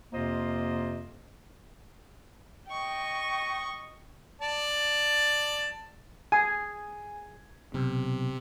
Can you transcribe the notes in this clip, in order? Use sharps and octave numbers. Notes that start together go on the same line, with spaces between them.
F2 C3 A#3 F4 C5 D#5
D#5 G5 C#6
D5 A5
G#4 G#5
B1 C3